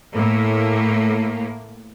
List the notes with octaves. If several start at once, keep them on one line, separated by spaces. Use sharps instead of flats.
A2 A#3